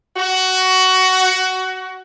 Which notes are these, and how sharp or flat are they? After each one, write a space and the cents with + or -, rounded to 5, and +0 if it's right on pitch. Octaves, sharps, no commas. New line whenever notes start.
F#4 +15